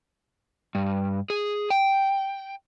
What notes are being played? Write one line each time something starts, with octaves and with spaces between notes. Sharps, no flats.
G2
G#4
G5